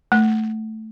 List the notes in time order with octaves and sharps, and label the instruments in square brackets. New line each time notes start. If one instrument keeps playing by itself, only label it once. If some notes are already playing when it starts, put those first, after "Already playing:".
[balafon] A3